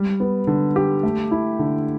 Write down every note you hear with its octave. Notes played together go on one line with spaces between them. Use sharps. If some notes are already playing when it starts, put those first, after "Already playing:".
Already playing: G3
B3
D3
G4
A3
E4
D3